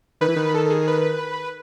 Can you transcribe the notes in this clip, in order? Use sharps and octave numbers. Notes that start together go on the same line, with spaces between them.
D#3 B4
E3
D#3
A4
A4
G#4
B4